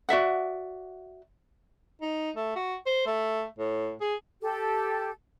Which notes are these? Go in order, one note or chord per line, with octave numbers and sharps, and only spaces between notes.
F#4 D5 E5 F#5
D#4
A3
F#4
C5
A3
A2
G#4
G4 A4